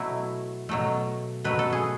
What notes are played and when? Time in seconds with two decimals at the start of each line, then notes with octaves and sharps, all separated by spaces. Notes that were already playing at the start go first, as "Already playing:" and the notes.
Already playing: B2 F#3 A3 E4
0.69 B2 F#3 A3
1.44 B2 F#3 A3 B4
1.59 A4
1.73 G#4